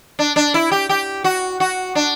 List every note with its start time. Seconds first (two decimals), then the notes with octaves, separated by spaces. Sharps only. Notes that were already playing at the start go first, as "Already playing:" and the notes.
0.19 D4
0.36 D4
0.54 E4
0.71 G4
0.89 G4
1.24 F#4
1.60 F#4
1.95 D4